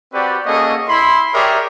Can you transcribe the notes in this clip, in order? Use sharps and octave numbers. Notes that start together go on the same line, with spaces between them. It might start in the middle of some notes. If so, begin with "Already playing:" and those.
C4 F#4 G4 B4 D5
A#3 C#4 F#4 G#4 A4 D#5
E4 B5 C6
G4 G#4 A#4 C#5 D5 E5